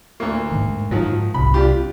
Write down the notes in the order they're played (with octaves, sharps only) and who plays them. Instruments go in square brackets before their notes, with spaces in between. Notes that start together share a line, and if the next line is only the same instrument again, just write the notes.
[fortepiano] D2 A#3
[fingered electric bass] G#2 D#3
[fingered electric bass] G#2 [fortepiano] D#3 F3 F#3
[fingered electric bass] C2 C3 [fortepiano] B5
[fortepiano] D4 F4 G4